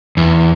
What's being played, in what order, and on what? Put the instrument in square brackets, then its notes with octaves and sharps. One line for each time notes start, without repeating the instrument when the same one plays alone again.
[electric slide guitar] E2